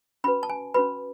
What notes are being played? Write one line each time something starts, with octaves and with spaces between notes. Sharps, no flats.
C#4 F#4 B4 B5
A5
G#5
C#4 F#4 B4 B5